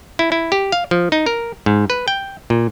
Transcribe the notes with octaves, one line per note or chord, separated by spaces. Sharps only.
E4
E4
G4
F5
F3
D#4
A#4
G#2
B4
G5
A#2